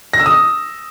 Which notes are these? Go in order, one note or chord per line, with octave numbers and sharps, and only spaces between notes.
A#6
E6
D#6